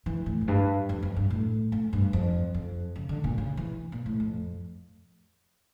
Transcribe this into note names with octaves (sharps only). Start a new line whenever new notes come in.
E3
A2
F2
G2
F2
F2
G2
A2
A2
G2
F2
F2
C#3
D3
A#2
C#3
E3
A#2
A2
F2